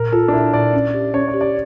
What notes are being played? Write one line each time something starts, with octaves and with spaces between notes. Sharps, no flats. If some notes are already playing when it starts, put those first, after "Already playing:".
Already playing: A#2 A#4
F4 A4
D4
A#2 E4
A#2 D5
C#4
G4
C#4 C#5
D5
G4
D5